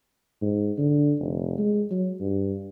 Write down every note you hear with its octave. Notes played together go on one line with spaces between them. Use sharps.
G#2
D3
F1
G#3
F#3
G2